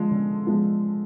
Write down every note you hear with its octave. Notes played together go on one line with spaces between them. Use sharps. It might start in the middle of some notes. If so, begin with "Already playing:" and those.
Already playing: D3 F3 G#3
D3
F3 G#3